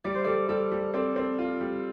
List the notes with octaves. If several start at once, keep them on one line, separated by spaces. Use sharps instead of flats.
G3 D5
C5
G3 A4 D5
G3 A4 D5
G3
C4 A4 D5
C4
F4
G3